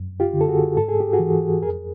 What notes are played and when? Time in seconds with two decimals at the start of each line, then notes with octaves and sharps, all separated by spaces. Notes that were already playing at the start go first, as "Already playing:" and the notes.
Already playing: F#2
0.20 F4 G4
0.33 D3
0.41 A4
0.48 F#4 G#4
0.76 G#2 A4
0.88 G#4
1.00 G4
1.13 F#4 G#4
1.19 E3
1.62 F2 G#4 A#4